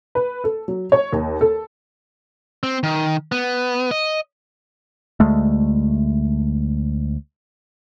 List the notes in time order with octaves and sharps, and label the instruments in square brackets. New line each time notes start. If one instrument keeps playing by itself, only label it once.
[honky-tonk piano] B4
A4
F#3
C#5
D#2
A4
[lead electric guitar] C4
D#3
B3
D#5
[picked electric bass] D2 G#3 A3